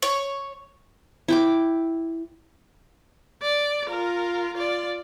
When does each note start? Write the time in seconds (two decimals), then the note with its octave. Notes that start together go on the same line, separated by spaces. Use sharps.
0.02 C#5
1.28 E4 G5 D6
3.42 D5
3.89 F4 A#4
4.53 F4 D5